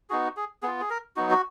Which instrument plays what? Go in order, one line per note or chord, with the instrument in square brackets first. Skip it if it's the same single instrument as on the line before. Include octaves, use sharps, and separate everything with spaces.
[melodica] B3 D#4 F#4 G#4
G#4
B3 F4 G#4
G#4
A#4
F#3 B3 D#4 F#4
F#4